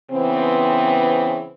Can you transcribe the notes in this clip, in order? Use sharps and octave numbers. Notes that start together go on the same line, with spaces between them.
C#3 E3 B3 C4